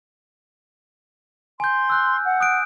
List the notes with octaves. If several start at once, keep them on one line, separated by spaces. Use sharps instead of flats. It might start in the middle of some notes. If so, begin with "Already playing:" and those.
G#5 C6 G6
E6 F#6 G6
F#5
D#6 F#6 D7